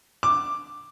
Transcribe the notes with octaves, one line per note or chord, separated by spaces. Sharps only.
D6